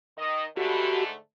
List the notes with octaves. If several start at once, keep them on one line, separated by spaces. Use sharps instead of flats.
D#3 D#5
G#2 D3 A3 F#4 G4 B5